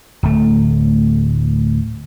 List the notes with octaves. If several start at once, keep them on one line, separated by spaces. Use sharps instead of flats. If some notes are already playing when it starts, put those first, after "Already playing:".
D1 A3